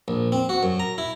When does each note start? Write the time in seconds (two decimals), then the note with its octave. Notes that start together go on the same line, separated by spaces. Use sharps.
0.08 A#1
0.32 C4
0.49 F#4
0.63 F#2
0.80 A#5
0.98 E4